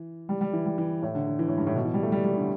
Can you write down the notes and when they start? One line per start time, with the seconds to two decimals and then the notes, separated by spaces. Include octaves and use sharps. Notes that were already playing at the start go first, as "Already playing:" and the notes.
Already playing: E3
0.29 G3
0.41 G3
0.53 E3
0.66 G3
0.78 E3
1.02 A2
1.15 D3
1.27 D3
1.39 E3
1.48 A2
1.58 G2
1.67 A2
1.76 B2
1.85 E3
1.94 G3
2.03 A3
2.12 G3
2.24 G3
2.37 D3